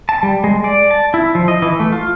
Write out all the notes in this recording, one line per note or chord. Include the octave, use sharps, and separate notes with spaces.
A5
G3
G#3
D5
A5
E4
F3
D#5
E3
A3
F4